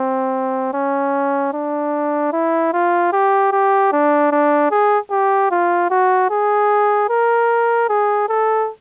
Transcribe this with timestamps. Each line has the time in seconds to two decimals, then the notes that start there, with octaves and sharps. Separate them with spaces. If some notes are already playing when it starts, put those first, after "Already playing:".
Already playing: C4
0.74 C#4
1.53 D4
2.33 E4
2.73 F4
3.12 G4
3.52 G4
3.92 D4
4.31 D4
4.71 G#4
5.11 G4
5.50 F4
5.90 F#4
6.30 G#4
7.09 A#4
7.89 G#4
8.29 A4